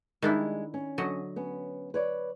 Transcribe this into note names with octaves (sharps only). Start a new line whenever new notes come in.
D#3 G3 G#3 D4 E4
C#4
D3 F#3 D#5
B3 C#4
B4 C#5 D5